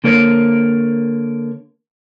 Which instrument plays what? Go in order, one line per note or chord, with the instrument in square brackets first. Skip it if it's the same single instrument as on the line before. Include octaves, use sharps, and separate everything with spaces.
[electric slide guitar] D3 A#3 A#4 C#5